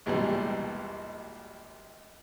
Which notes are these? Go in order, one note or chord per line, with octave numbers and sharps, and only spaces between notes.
A#1 D#2 G#2 B2 E3 G3